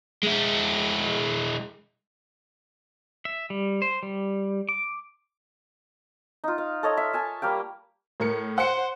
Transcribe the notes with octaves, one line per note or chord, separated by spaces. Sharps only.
G#3 E4
E5
G3
C5
G3
D6
D#4 F4
F5
A4 C#5 D#5
E5
E5 G#5 A5
G3 A#3 F5 G5
A2 A#4 C#7
C5 F#5 C#7